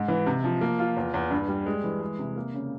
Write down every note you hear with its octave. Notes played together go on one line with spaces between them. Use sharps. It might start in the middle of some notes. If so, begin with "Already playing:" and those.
Already playing: G#2
E3
C3
F3
A#3
F4
E2
E2
G2
G3
G#3
E3
G#3
C3
A#3
C#3